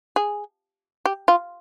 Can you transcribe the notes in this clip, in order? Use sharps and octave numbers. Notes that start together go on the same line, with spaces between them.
G#4
G4
F4